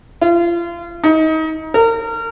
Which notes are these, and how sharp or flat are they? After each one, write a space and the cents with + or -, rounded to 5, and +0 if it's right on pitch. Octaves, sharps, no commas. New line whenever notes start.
F4 -35
D#4 +30
A#4 -30